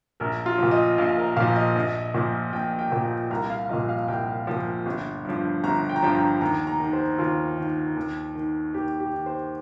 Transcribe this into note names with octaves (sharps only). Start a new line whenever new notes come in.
A#1 A#4
F4
A#2 F3
D#5
A#1 F5
A#4
A#2 F3 F5
D#5
A#1
A#2 F3
A#1 G5
G5
A#2 F3
G5
C2 A#5
F5
A#2 F3 D#5
F5
C2 G5
A#2 F3
G1
G2 F3
G1 A#5
G5
A#5
G2 F3 G5
A#5
D#2 A#5
A#5
D#3
C5
D#2 F4
D#3
D#2
D#3
D#2 G4
G4
D#3
C5